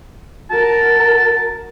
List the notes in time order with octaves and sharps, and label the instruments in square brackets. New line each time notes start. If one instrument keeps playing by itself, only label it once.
[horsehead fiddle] F#4 A#4 [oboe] A5